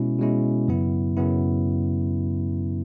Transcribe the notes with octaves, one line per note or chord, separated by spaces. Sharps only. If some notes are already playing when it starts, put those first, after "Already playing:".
Already playing: B2 G#3 C#4 E4
B2 G#3 C#4 E4
F#2 C#3 F#3 B3 E4
F#2 C#3 F#3 B3 E4